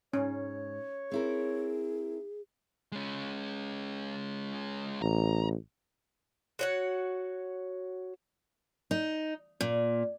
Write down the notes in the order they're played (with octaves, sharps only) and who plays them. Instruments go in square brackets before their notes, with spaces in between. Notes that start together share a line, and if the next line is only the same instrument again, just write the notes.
[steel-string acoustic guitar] G#2 [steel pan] C#4 [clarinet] C#5
[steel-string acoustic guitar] C4 E4 A#4 [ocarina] G#4
[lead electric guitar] G#3 C#4
[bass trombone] A1 [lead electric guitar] A#5
[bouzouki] F#4 C#5 F#5
[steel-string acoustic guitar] D#4
A#2